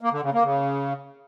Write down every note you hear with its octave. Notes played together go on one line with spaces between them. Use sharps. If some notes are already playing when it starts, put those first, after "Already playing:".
A#3
D3
C#3
A#3
C#3